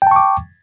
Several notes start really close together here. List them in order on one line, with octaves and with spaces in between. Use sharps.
G5 A5 C#6 D6